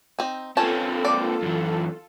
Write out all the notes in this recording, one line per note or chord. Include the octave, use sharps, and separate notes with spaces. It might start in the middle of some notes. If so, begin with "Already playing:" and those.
C4 D#4
A#3 C4 C#4 F4 A4 A5
D5
F#2 E3